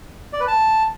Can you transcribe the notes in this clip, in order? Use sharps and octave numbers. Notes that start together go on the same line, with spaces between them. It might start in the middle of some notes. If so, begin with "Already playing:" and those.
D5
B4
A5